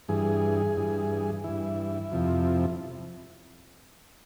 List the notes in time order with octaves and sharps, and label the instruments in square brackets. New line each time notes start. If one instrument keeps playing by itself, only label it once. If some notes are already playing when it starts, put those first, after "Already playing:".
[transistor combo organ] G2 E3 G#4
G2 E3
G2 E3 E4
F2 C3 F3